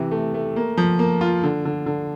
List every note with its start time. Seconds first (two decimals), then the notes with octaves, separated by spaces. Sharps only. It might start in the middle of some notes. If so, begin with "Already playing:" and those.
Already playing: C3 E3
0.11 A3
0.34 A3
0.56 A#3
0.77 F3
0.99 A#3
1.21 F4
1.43 D3
1.65 D3
1.86 D3